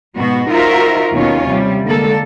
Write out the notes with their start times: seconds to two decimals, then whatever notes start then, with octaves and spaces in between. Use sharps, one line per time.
0.15 G#2 B2 B3 F#4
0.49 D#4 F4 F#4 A#4 C5 E5
1.13 D#2 B2 D#3 C#4 F4 C#5
1.47 C3 G3
1.84 D3 G#3 A#3 A4